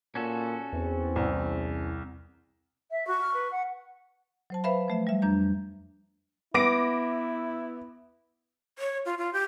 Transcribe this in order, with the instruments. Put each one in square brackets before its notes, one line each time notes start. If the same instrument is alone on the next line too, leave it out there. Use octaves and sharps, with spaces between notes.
[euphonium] A#2 [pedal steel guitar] C#4 F#4 A4
[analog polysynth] E2 [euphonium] C4
[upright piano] C2
[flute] E5
[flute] F#4 [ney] C#6
[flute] F6
B4
F#5
[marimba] F#3 C5 A5
B4 C5 E5 F5 B5
F3 A3 E5
G3 E5
F2 G3 D4 A#5 G6
[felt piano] B3 [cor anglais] E4 [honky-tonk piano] D6 A#6 D7
[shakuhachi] C#5
F4
F4
G4